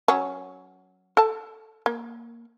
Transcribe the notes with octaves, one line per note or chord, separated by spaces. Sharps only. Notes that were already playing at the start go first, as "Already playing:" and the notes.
F#3 C#4
A4 A5
A#3